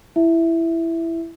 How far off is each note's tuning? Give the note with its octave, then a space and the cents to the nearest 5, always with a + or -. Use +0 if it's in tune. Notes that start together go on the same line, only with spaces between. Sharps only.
E4 +10 E5 +0